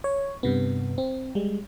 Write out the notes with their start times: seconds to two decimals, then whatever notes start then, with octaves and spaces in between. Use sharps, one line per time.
0.04 C#5
0.43 G2 C3 B3
0.98 C4
1.35 G3 G#3